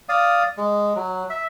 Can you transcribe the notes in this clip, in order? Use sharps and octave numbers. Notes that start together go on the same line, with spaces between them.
D5 F5 D#6
G#3
F#3
E5